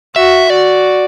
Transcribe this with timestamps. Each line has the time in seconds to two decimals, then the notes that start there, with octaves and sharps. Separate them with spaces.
0.16 F#4 E5
0.50 F#4 D5